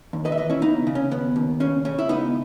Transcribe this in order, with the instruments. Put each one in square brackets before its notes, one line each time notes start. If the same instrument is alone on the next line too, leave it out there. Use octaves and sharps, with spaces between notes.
[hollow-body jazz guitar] D#2
B4 D#5
E5
E3 B4 D#5
C#4 E4
C#3 B3 D#4
C#3
C#4
D#2 B3
D#2
C#3 C#4
C#3 C#4
E4
C#2 B3 D#4